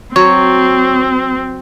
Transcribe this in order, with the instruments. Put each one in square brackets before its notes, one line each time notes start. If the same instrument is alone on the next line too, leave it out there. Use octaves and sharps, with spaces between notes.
[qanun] F#3 [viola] C4 [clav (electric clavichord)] C#5